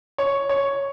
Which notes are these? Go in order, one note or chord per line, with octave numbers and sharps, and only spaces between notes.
C#5
C#5